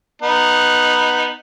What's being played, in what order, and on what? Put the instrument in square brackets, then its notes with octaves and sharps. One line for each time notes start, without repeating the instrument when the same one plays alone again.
[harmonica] B3 D#4